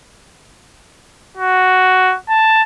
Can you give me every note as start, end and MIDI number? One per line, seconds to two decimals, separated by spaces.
1.37 2.16 66
2.29 2.63 81